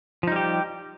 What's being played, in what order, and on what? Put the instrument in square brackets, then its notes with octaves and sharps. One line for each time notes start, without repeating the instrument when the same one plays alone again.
[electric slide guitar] F3
D#4
G3
G4